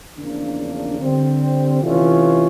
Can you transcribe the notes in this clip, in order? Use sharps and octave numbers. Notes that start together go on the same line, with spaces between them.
E2 C#3 F3 A#3 D4
D3 G3 C4
C3 E3 A3 C#4 F4